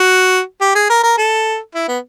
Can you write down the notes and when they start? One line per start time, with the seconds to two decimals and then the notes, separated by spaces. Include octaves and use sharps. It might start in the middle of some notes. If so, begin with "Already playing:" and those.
Already playing: F#4
0.61 G4
0.75 G#4
0.90 A#4
1.03 A#4
1.18 A4
1.75 E4
1.88 B3